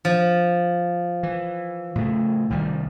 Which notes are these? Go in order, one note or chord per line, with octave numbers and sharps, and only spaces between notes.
F3
E3
A2 C#3 A3
C2 D#3 G3